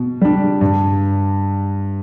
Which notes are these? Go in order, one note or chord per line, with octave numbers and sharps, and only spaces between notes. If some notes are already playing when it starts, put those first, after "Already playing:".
Already playing: B2
G3 D4
G2